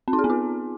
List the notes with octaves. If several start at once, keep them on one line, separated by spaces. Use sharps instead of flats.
C4
D#4
G#4
B3
F4